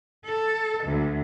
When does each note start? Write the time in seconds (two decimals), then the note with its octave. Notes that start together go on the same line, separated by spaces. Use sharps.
0.23 A4
0.84 D2